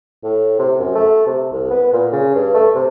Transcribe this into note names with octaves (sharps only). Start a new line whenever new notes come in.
A2
C3
F#2
A3
C3
C2
B3
A#2
C#3
G2
A3
C3